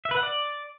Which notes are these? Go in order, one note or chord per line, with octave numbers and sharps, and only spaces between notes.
E5
B4
F#5
D5